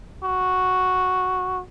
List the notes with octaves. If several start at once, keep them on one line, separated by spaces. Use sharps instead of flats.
F#4